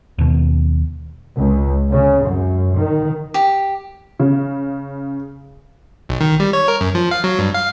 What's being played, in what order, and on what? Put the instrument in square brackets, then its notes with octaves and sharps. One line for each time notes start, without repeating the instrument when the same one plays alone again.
[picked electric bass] D#2 B2
[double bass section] C#2
C#3
F#2
D#3
[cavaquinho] G4
[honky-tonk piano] C#3
[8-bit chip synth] B1
D#3
G3
C#5
A#4
F#2
F3
F5
F#3
G2
F5